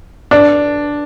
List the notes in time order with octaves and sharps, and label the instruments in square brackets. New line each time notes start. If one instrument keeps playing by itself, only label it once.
[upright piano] D4